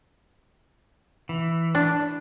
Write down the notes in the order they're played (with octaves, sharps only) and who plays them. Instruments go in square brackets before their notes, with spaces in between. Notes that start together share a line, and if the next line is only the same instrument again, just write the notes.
[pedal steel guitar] E3
[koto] D4